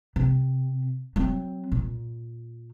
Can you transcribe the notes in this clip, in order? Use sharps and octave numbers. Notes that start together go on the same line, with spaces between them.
C3
F#3 C4
A#2